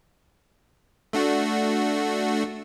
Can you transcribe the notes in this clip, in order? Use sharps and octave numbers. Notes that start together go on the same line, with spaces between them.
A3 D4 F#4